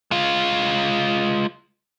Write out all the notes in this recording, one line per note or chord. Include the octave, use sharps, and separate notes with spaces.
G#3 F4